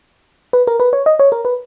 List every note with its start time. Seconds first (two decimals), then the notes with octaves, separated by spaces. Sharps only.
0.53 B4
0.67 A#4
0.80 B4
0.93 C#5
1.06 D#5
1.19 C#5
1.32 A#4
1.45 B4